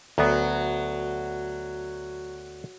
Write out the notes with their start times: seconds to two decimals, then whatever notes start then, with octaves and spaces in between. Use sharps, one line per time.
0.18 D2 F#3 B3